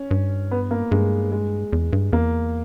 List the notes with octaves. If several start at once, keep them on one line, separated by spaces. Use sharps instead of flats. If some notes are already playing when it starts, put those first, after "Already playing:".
Already playing: C#4
G2
B3
A#3
G2 G#3
G#3
E2
G2
E2 A#3